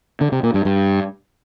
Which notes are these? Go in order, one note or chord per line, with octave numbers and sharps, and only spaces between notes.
D3
C3
A#2
G2
G2